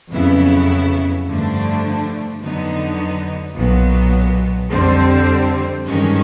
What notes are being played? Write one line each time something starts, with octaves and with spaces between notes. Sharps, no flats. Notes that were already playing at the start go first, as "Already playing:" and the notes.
F2 C#3 F#3 B3 E4
G2 D3 F3 A3 D4
F2 D3 F#3 B3 D#4
B1 A#2 F#3 B3
F2 D3 G3 C4
G2 D#3 G#3 C#4